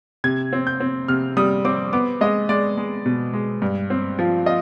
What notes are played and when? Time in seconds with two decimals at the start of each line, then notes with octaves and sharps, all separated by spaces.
0.24 C3 G#6
0.53 C4
0.67 G6
0.80 C4
1.08 C3 F6
1.37 G3 D#6
1.65 C4 D6
1.93 B3 D6
2.21 G#3 D#5
2.49 G#3 D5
2.77 G#3
3.06 B2
3.33 G#3
3.62 G2
3.90 C4
4.19 F3
4.46 F4 D#5